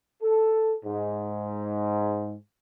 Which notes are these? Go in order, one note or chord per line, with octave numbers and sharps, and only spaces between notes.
A4
G#2